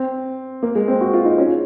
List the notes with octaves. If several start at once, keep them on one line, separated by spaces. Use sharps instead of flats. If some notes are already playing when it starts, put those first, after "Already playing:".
Already playing: C4
A#3
G#3
C4
F#4
F4
D#4
C#4